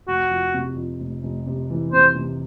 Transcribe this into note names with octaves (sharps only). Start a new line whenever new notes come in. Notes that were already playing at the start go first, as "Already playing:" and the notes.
F1 F#4
F2
C3
F2
F1
F1
C3
E3
C3 C5
C3